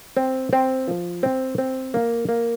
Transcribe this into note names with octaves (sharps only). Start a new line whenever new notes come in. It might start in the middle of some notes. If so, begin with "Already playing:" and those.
C4
C4
F3
C4
C4
A#3
A#3